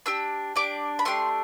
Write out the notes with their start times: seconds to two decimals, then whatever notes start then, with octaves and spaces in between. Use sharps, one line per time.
0.06 D4 G4 E6
0.56 D4 G4 D6
0.99 B5
1.05 A3 D4 G4 C6